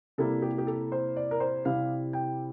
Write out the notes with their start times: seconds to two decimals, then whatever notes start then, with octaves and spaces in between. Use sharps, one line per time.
0.18 C3 G3 A#3 E4 A4
0.42 G4
0.58 G4
0.67 A4
0.92 C5
1.16 D5
1.31 A#4
1.40 C5
1.65 C3 G3 C4 E4 F5
2.13 G5